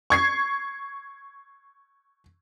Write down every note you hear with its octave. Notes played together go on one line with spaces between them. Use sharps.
C#6 G#6 C7